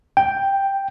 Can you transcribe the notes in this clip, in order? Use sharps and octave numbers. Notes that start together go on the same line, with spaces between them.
G5